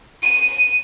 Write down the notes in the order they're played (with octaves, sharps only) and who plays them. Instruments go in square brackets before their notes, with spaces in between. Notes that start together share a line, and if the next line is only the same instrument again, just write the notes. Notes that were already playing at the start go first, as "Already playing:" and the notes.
[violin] D#7